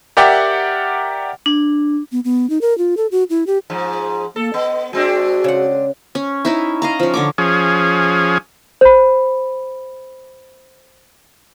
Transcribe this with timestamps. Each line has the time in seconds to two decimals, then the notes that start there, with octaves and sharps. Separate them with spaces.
0.17 G4 A#4 D5 E5 F#5 G5
1.46 D4
2.12 B3
2.24 B3
2.50 D#4
2.61 A#4
2.78 F4
2.97 A4
3.11 F#4
3.30 E4
3.47 G4
3.70 G#2 F3
4.36 A#3 A4
4.54 B3 D#5
4.93 G#3 C4 D4 F#4
5.44 C#3 F#5
6.15 C#4
6.45 C#4 D#4 E4
6.82 D#5 F5 A#5
6.99 F3 C#4
7.14 D3 C#5 D6
7.38 F3 C#4 G#4
8.81 C5 B5